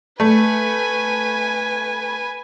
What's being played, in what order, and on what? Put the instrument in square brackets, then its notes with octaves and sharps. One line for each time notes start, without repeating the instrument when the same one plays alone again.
[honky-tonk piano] A3 [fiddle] B4 G#5